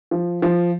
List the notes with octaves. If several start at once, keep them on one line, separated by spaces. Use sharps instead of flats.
F3
F3